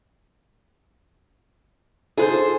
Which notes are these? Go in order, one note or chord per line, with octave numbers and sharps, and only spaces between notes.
D#4 F4 G#4 A4 B4 C5